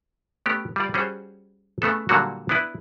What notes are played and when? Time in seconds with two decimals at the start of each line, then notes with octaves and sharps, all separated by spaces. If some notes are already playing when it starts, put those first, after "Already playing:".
0.46 A3 B3 C#4 G4
0.76 G3 F4 D5
0.94 G3 C#4 F#4 G#4 C5
1.82 C#3 A3 B3 A4
2.09 A#2 D3 F#3 G3 A#3 F#4
2.49 B3 D4 E4 B4